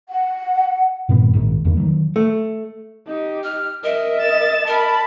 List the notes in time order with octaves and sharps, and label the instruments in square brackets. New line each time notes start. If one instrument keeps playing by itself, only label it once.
[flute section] F#5
[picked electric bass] G2 A#2 D#3 B3
A#1 G#2 D#3
E2 D3 A#3
D#3 F#3
[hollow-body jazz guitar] A3
[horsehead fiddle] D#4 G4
[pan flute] F6
[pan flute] A#4 [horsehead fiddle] D#5 E5
[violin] A6 E7
[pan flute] A#4 [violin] A5 B5